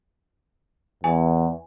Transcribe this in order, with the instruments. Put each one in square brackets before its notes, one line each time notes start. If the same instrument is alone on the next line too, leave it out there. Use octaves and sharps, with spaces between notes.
[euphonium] E2 [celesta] G#5